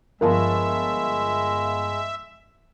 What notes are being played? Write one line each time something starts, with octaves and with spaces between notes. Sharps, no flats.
G1 F3 G#3 A#4 E5 A5